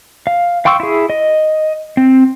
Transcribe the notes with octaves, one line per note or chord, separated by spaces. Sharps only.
F5
F5 G5 C6 C#6 E6
E4 G#4
D#5
C4